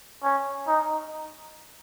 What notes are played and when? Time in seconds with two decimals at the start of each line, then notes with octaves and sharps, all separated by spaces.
0.24 C#4
0.68 D#4